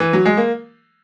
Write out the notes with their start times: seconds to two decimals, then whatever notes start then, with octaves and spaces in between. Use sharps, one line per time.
0.00 E3
0.13 F#3
0.25 G#3
0.37 A#3